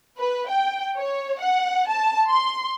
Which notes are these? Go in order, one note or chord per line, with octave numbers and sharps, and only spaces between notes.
B4
G5
C#5
F#5
A5
C6